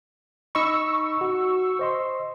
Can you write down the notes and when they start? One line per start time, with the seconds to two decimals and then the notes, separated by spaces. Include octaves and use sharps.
0.55 D#4 D#5 B5 C#6 E6
1.21 F#4
1.79 C5 D#5 C6